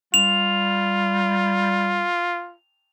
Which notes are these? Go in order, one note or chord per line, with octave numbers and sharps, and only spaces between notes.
G3 F4 F7